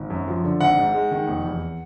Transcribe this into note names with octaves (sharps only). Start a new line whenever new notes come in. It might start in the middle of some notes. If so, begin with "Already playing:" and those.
Already playing: G#1
F#2
F3
D3
G#1 F#5
G#2
G#3
D#3
F1
E2